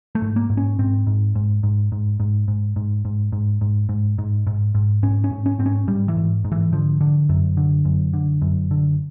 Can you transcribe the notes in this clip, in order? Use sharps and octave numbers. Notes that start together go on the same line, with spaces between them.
A3
G#2
A#3
G#2
C#4
G#2 C4
G#2
G#2
G#2
G#2
G#2
G#2
G#2
G#2
G#2
G#2
G#2
G#2
G#2
G#2
G#2 C#4
C#4
G#2
C#4
G#2 C4
C#4
G#2 G3
E3
G#2
G#2
E3
D3 F3
D3
F#2
D3
F#2
D3
F#2
D3